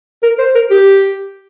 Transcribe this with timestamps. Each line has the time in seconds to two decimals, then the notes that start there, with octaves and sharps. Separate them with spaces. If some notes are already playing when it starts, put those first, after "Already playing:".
0.23 A#4
0.39 C5
0.55 A#4
0.71 G4